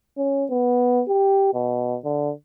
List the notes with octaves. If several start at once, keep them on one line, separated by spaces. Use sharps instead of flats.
C#4
B3
G4
B2
D3